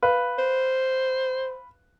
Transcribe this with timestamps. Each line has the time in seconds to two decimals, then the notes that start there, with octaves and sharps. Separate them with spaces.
0.03 B4 F5
0.39 C5